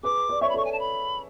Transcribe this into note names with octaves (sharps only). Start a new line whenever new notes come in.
G#4 B4 D6
B4 D5
C#5 E5 C#6
B5
A4 C#5 C#6
G#5
A5
B5